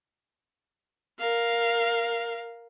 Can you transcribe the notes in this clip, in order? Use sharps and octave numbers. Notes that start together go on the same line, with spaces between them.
A#4 F5